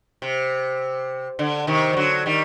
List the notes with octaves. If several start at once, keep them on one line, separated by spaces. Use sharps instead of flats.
C3
D3
C3 D#3
G3
D3 F#3
D#3 G3